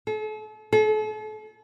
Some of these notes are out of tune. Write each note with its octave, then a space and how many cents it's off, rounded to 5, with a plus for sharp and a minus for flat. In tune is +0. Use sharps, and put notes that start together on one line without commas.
A4 -40
A4 -40